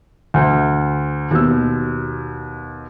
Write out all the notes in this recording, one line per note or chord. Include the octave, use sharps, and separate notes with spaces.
D2
D#2 B2 E6